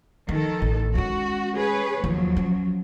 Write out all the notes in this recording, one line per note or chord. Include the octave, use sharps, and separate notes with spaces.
D#3 F3 A4
A1
G#3 C#4 F#4
G#4 B4 C#5
D#2 F3 F#3
C#4